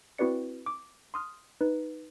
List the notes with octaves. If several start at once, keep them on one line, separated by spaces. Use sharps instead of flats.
C4 E4 F#4 B4 D5 C#7
D6
C6 D#6 F6
D#4 B4